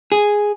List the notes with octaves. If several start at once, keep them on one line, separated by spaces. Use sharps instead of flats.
G#4